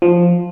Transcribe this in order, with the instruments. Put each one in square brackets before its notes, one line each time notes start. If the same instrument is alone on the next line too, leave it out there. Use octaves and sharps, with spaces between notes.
[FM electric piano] F3